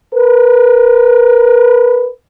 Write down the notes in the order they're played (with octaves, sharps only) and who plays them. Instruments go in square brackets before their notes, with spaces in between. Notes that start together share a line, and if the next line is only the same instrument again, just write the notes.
[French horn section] A#4 B4